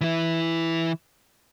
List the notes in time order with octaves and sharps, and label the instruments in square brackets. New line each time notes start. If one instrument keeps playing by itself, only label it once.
[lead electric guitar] E3 E4